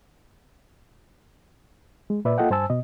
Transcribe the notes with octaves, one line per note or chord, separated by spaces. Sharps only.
G#3
A#2 B4 D5 E5
A#3 F4 A4 D#5 F#5 G5
G2 C5 G#5 A5 E6
B2 D#5